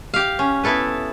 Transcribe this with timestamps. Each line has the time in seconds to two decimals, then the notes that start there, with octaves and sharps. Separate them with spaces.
0.14 G4 F5
0.39 C#4
0.63 B3 E4 A4 B4